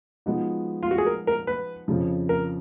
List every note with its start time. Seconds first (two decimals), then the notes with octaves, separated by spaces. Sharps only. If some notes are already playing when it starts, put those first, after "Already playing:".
0.26 F3 G#3 B3 D#4 F#4
0.83 F4
0.91 F#4
0.98 G#4
1.06 A#4
1.27 A#4
1.47 B4
1.88 F2 C#3 F3
2.29 A#4